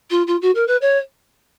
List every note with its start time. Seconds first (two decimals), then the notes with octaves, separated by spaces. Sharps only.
0.10 F4
0.27 F4
0.41 F#4
0.55 A#4
0.67 B4
0.81 C#5